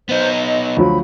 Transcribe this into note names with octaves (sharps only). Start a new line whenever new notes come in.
B3 D#4 C5
D#5
D2 F3 F#3 B5